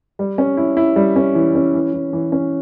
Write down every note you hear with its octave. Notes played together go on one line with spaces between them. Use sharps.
G3
C#4
E4
E4
G3
C#4
E3
C#4
E3
E3
E3
C#4